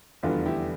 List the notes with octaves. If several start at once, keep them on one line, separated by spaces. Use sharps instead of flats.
F1 E2 D3 G3 B3 D4 F4
E4 G4